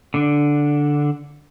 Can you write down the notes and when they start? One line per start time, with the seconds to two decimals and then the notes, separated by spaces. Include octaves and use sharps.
0.14 D3 D4